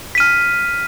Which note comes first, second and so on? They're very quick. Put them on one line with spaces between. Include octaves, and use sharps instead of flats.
B6 D#7 F6